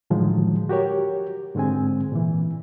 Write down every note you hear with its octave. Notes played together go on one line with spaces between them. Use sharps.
A2 D3 D#3 F3 F#3 G#3
F#4 G4 A#4 C#5
G#2 D3 G#3 C4 G#5
A#2 E3